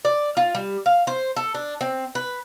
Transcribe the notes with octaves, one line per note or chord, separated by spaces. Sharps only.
D5
F4
G3
F5
C5
A4
D4
C4
B4